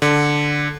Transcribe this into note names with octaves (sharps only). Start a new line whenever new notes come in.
D3